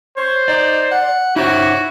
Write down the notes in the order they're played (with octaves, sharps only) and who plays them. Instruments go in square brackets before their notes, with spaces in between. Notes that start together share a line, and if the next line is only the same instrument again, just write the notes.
[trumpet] C5 [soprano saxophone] C#5
[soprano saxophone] D#4 [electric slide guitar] D5
[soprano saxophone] F#5
[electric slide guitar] D#4 C5 C#5 [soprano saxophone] E4 [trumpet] F#4